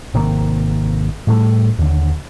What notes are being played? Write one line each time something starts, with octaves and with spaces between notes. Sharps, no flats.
G#1 C3 D#3 A#3
A2 G3 A3
D#2 D3